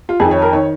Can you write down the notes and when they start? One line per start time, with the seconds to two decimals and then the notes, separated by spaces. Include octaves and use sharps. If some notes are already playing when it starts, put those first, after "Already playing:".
0.09 F4
0.20 F2 D#3 G#4
0.31 C#5
0.42 A#4
0.53 D#3 C#5